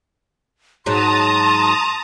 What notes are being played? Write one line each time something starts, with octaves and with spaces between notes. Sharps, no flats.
G#2 F#3 A5 A#5 C6 D#6